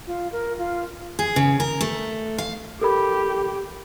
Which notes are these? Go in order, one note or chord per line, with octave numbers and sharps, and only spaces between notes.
F4
A#4
F4
G#4
C#3
A#4
A3
F5
G4 A4 A#4 B5